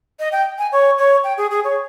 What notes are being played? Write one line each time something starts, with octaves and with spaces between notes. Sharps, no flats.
D#5
G5
G#5
C#5
C#5
G5
G#4
G#4
C#5